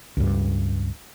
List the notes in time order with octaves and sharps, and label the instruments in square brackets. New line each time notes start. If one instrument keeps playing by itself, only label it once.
[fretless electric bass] C#2 G2